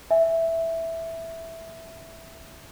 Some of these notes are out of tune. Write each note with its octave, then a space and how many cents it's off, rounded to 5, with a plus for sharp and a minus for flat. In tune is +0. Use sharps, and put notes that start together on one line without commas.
E5 +0 G#5 -5